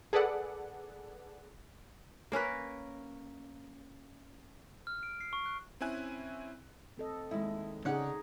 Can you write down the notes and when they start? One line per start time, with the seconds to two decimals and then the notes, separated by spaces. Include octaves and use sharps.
0.13 G#4 A4 B4 D5 F#5
2.32 A#3 C#4 A#4 B4
4.87 F6
5.03 D7
5.20 C7
5.33 C#6
5.46 F#6
5.81 C4 C#4 E4 G#5 F#6
6.98 C4 A4 D#5
7.31 D#2 G#3 E4
7.85 C#3 C#4 D#4 G#4 D5 F#5